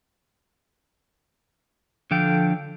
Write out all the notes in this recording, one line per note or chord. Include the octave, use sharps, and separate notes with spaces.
D3 F3 A4 F5 G5